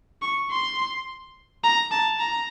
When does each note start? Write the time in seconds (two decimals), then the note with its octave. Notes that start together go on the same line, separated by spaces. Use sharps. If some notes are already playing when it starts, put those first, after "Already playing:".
0.22 C#6
0.51 C6
1.64 A#5
1.91 A5
2.19 A#5